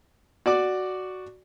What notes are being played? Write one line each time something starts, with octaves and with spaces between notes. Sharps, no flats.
F#4 D5 D6